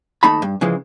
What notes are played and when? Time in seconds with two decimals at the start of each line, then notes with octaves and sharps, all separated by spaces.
0.23 D#2 A3 D#4 A5 B5
0.42 G2
0.61 C#3 E3 F3 G#3